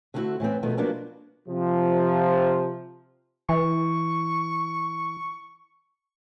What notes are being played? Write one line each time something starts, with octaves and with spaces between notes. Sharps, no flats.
D3 A3 B3 C4 E4 F#4
A2 E3 B3 C4
B2 D#3 F3 A3 B3
F3 F#3 A#3 B3 D4 F#4
C3 F3
E3 C#6